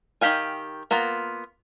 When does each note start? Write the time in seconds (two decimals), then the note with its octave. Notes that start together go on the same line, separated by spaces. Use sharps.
0.21 D#3 F3 G4 F5 G#5
0.91 A#3 B3 F4 A#5